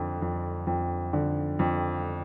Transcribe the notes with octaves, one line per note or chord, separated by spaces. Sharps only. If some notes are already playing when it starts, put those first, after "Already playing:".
Already playing: F2 D3
F2
F2
D3
F2